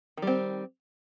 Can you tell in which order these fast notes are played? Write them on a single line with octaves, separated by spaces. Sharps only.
D#3 G3 C4